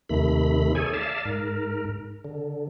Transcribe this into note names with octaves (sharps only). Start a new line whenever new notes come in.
D#2 C3 D#3 A3 B5
G#4 A4 C#5 G#5
D5 E5 F5 A5
G#2 A#4
D3